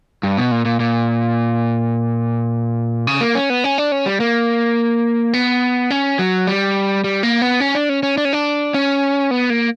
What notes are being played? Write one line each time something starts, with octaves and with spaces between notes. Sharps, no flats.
G2
B2
A#2
A#2
A#2
C#3
A#3
C#4
B3
C#4
D4
C#4
G3
A#3
B3
C#4
F#3
G3
G3
A#3
B3
C#4
D4
C#4
C#4
D4
C#4
D4
C#4
B3
A#3